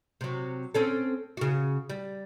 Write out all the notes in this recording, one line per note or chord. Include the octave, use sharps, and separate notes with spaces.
C3 F#3
C4 C#4 A4
C#3 F#4
G3